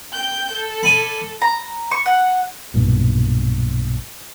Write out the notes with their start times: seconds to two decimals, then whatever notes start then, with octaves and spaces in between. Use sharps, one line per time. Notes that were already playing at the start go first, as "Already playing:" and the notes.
0.13 G5 G6
0.52 A4
0.83 D5 G#5 B5
1.42 A#5
1.91 C#6
2.06 F#5
2.74 B1 G2 A#2